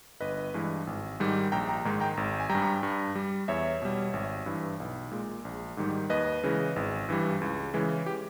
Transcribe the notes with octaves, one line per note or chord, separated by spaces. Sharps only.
G1 B4 D#5
G2 E3 G#3
G#1
G#2 D#3 G3
A#1 G5 A#5
G5 A#5
G#2 D#3 G#3
G5 A#5
G#1
G#5
G3 G5 A#5
G2
G2
G3
E2 C#5 E5
B2 G3
G#1
G2 E3
B1
A#2 G#3
A#1
G#2 D#3 G3
D#2 B4 D#5
C#3 E3 G#3
G#1
G2 E3 G3
C#2
C#3 E3 G#3
G4